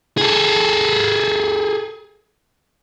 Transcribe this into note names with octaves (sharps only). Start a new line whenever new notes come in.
G#4 A4